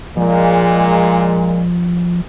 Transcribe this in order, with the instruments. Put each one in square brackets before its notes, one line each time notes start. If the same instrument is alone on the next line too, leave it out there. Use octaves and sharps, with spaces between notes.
[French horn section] A#2 G#3 A#3 [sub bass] F3